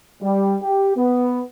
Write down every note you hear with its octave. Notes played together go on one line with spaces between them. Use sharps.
G3
G4
B3